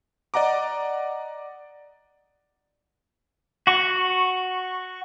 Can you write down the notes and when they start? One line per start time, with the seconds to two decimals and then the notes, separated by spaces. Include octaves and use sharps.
0.34 D5 D#5 F#5 A#5 D6
3.67 F#4 C#6